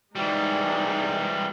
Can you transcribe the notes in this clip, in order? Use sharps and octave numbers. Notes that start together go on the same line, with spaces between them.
E3 G3 G#3 D#4